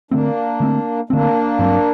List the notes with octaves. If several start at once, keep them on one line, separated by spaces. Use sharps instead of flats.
D3 A3 A#3 C4 D4
D3 A3 C4
D3 A3 A#3 C4 D4
G2 F#3 C4